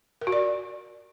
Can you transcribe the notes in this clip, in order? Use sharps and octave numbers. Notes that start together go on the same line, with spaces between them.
A#4
F#4
D5